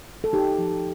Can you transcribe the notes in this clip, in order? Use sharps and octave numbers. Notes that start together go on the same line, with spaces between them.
A4
D#4 G4
F3